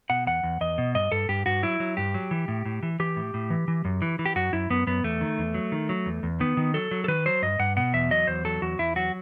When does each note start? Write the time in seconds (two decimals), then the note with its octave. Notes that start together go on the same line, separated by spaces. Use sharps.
0.10 B2 F#5
0.27 E2 F#5
0.43 E2
0.61 E2 D#5
0.78 B2
0.95 G2 D#5
1.12 G2 A4
1.29 G2 G4
1.46 G2 F#4
1.63 F#3 E4
1.80 F#3
1.97 G2 G4
2.14 F#3
2.31 E3
2.48 A2
2.66 A2
2.83 E3
3.00 E3 G4
3.16 A2
3.34 A2
3.50 E3
3.68 E3
3.85 F#2
4.02 E3
4.19 E3
4.26 G4
4.36 F#2 F#4
4.53 F#2 E4
4.70 F#2 B3
4.87 F#2 B3
5.04 E2 A3
5.21 D#3
5.38 E2
5.54 F#3
5.72 D#3
5.89 F#3
6.06 E2
6.23 E2
6.40 D#3 B3
6.57 D#3
6.74 F#3 A4
6.91 F#3
7.04 A4
7.08 D#3 B4
7.26 F#3 C5
7.42 G2 D#5
7.59 G2 F#5
7.77 B2 F#5
7.93 E2 E5
8.11 F#3 D#5
8.27 E2 C5
8.45 F#3 A4
8.61 E2 F#4
8.79 E2 E4
8.96 F#3 F#4